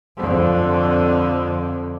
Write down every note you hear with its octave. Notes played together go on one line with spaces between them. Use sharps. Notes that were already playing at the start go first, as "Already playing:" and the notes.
F2 D3